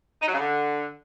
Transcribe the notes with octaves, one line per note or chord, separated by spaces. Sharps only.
D#4
F#3
C#3
D3